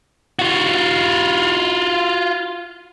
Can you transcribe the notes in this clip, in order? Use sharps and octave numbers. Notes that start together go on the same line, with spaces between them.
F4 F#4